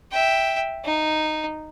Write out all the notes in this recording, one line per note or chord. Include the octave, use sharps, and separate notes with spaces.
E5 G5
D#4